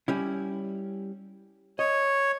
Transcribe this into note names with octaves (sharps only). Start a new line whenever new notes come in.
G3 C#4 E4
C#5 D#5